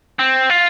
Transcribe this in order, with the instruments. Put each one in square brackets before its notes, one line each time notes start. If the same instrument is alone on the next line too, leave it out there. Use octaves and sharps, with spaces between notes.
[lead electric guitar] C4
F4